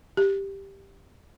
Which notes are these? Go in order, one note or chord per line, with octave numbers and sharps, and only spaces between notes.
G4